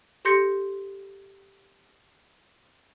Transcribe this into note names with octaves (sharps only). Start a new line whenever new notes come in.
G4 A4 C6 G6 A#6 C#7